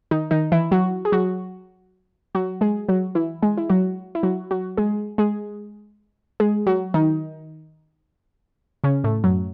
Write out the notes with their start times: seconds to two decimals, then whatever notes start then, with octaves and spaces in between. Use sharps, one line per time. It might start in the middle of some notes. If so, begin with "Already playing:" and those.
0.11 D#3 D#4
0.31 D#3 D#4
0.52 E3 E4
0.71 F#3 F#4
1.05 G#4
1.12 F#3 F#4
2.35 F#3 F#4
2.61 G#3 G#4
2.89 F#3 F#4
3.15 E3 E4
3.42 G#3 G#4
3.58 E4
3.70 F#3 F#4
4.15 E4
4.23 F#3 F#4
4.51 F#3 F#4
4.77 G#3 G#4
5.18 G#3 G#4
6.40 G#3 G#4
6.67 F#3 F#4
6.94 D#3 D#4
8.84 C#3 C#4
9.04 A2 A3
9.24 F#2 F#3